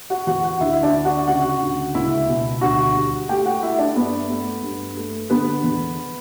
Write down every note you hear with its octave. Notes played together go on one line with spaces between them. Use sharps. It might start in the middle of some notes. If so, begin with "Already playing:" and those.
F#4 F#5
E2 F#4 F#5
F#4 F#5
D2 E4 E5
E5
D4 D5
D3
F#4 F#5
C#3 F#4 F#5
D2
C#2 E4 E5
B2
D2 F#4 F#5
G3
A3 G4 G5
F#4 F#5
A3 E4 E5
D4 D5
G2 B3 B4
A3
G2
A3
D3 B3 B4
E2